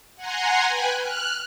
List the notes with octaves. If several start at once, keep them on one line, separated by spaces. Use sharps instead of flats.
F#5 G#5 A#5 C6
B4 G5 G#5 F#6
F6 F#6